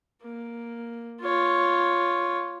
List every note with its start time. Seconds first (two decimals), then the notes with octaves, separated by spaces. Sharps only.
0.22 A#3
1.22 F4 C#5